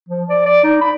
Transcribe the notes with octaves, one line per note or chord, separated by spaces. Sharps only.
F3
D5
D5
D#4
B5